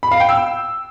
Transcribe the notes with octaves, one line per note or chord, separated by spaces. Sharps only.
B5
F5
G5
E6